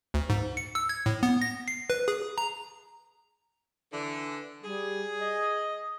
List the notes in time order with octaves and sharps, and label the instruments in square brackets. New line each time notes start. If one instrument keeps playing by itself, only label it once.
[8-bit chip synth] D2
G#2
C#7
E6
G#6
A2
B3
A#6
C7
B4
G#4
A#5
[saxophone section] D3 E3
[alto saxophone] G3 [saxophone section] G#4
[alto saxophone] D#5